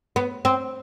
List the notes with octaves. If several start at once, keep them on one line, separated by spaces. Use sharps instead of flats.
B3
C4